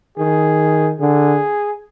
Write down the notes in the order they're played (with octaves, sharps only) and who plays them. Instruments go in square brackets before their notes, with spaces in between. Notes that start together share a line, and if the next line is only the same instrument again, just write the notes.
[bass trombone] D#3 [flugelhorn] G#4
[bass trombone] D3 [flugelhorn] G#4